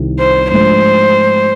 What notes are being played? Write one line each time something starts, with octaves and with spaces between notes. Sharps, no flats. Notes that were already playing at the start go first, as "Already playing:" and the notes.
Already playing: C2 C3 D#3 G3
C5
G#2 F3 A3 D4 C5